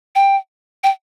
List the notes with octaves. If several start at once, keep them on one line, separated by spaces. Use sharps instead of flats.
G5
G5